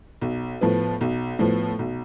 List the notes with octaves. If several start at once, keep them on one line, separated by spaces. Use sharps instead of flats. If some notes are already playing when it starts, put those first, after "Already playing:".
B1
A2 F3 B3
B1
A2 F3 B3
B1